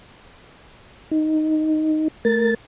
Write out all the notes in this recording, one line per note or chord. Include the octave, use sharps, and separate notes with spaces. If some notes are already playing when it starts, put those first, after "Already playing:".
D#4
A3 A#4 A6